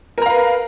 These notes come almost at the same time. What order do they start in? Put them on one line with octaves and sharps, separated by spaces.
A#4 A#5 F5 B4